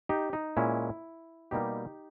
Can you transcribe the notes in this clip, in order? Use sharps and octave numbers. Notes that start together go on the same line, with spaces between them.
D#4 G4
D#4
A#2 G#3 C#4 E4
B2 G3 A#3 D#4 G4